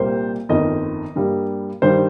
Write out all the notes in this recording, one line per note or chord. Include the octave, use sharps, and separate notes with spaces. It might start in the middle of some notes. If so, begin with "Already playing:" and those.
Already playing: C2 A#2 G3 A#3 C5
G1 F2 D#3 D#5
G2 G3 A#3
G2 D#3 G3 C5